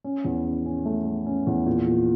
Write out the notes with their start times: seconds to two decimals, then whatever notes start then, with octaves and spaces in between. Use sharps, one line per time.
0.04 C#4
0.25 E2
0.45 C#4
0.66 C#4
0.85 A3
1.06 A3
1.26 C#4
1.47 E2
1.66 A#2
1.87 A#2